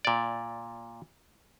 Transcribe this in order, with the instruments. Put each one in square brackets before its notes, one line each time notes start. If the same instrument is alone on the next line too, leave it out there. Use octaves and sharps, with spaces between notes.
[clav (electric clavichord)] A#2 D5